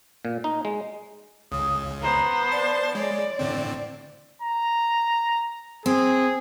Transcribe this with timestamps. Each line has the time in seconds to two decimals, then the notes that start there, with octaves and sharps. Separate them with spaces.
0.25 A#2
0.44 D#4
0.65 G#3
1.52 C#2 C#3 D#6
2.02 B3 C5 A#5
2.52 D5 A5
2.95 G#3 C#5 D5
3.39 A2 D3 C4
4.42 A#5
5.86 C4 G#4